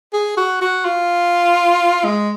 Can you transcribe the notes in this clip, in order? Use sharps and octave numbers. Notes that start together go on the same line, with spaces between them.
G#4
F#4
F#4
F4
G#3